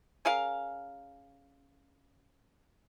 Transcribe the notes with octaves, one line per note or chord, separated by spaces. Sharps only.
C#4 G#4 A#4 F5